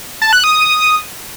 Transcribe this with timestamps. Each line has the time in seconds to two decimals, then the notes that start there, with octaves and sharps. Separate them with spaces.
0.22 A5
0.33 F#6
0.44 D#6